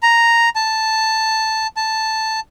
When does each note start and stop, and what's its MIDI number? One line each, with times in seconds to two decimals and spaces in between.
0.03 0.49 82
0.55 1.67 81
1.76 2.40 81